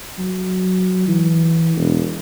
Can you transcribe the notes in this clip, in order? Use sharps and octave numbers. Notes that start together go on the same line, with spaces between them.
F#3
E3
E1